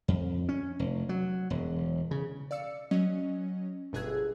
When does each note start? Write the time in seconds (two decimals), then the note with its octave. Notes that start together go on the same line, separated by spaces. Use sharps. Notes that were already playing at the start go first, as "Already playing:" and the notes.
0.08 F2
0.49 C#4
0.79 F1
1.09 F#3
1.50 E1
2.11 C#3
2.51 D5 F5 E6 C#7
2.91 F#3 C#4 D#5
3.93 G1 B2 G#4 E6 F#6 G#6